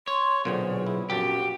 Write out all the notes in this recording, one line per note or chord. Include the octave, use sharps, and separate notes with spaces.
C#5 C6
B1 A#2 D3 C4 G#4
E4
A#1 F#2 F#4 G4 A5